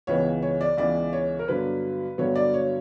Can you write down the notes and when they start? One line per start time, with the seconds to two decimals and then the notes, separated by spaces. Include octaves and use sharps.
0.07 C#2 C#3 E3 B3 C#5
0.42 C#5
0.61 D5
0.77 C#2 C#3 E3 B3 D5
1.13 C#5
1.39 A#4
1.48 G2 D3 F#3 B3 B4
2.18 G2 D3 F#3 B3 C#5
2.36 D5
2.54 C#5